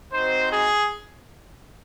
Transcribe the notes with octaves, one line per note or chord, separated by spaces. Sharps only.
C4 D#4 F#4 C5
G#4